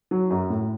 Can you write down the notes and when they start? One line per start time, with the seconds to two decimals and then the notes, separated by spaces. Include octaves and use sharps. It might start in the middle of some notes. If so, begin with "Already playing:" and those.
0.11 F#3
0.30 F#2
0.50 A2